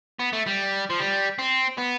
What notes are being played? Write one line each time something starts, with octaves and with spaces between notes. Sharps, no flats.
B3
A3
G3
F3
G3
C4
B3